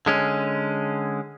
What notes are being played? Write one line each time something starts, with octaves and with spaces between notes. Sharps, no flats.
D3 G#3 C#4